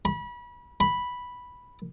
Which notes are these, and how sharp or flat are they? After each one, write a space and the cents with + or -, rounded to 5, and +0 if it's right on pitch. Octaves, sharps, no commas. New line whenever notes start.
B5 -30
B5 -5